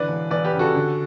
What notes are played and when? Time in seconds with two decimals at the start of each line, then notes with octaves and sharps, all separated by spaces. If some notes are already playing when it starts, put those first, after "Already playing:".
Already playing: D3 E3 B4 D5
0.08 E1
0.31 E1 B4 D5
0.45 G4 B4
0.53 C#3
0.59 F#4 A4
0.74 D3